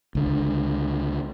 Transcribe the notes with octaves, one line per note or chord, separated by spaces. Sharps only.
C#2 D3